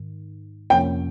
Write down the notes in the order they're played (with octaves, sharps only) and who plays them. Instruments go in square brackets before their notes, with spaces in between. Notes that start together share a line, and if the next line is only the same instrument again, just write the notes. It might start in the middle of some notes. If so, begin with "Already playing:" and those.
Already playing: [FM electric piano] G#2 D#3
[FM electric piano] F2 C3 F3 A#3 C#4 [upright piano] G5